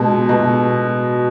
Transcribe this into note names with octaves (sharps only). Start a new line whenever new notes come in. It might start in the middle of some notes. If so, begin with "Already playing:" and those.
Already playing: B2 G#3 A4
B2